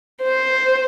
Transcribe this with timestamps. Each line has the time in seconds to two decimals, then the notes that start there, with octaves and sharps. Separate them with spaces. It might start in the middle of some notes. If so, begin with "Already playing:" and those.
0.22 C5